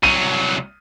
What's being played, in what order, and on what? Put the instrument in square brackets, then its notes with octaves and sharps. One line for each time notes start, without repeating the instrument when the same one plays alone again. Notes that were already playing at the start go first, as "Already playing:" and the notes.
[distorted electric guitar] C2 F#3 [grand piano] D#7